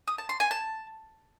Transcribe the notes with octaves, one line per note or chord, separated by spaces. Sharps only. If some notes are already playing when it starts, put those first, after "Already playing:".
D#6
A5
C6
G#5
A5